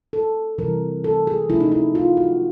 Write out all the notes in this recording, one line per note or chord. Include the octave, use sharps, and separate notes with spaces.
A4
C3 E3 G3 A#4
A4
G#4
C3 F3 A3 C#4 E4
D#4
E4
F4
F#4